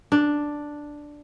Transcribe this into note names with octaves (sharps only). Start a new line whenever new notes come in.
D4